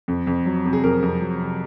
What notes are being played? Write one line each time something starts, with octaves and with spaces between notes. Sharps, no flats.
F2
F2
F#3
C3
G#4
F2 A#4
F2
F#3
C3